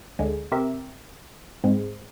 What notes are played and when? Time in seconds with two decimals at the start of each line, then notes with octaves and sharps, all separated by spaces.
0.19 D2 D3 G#3
0.52 C3 C4 G4 A#4 E5
1.64 G#2 G#3 C4